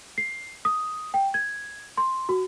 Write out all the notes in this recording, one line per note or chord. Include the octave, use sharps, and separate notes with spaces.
C7
D#6
G5
G#6
C6
F#4